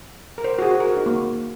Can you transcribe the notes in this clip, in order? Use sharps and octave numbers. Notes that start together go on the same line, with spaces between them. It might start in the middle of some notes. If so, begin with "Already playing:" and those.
A#4
C5
F#4
G#4
F#4
A#4
F#4
D#4
A#3